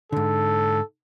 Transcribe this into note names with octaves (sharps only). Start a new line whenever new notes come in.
G#2 D3 A4